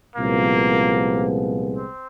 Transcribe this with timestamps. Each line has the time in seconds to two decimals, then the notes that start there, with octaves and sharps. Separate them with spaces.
0.16 C2 A#2 F3 G#3 A#3 B3
1.77 C4